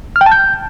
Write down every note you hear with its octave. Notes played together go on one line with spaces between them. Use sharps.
F6
G5
A5
G6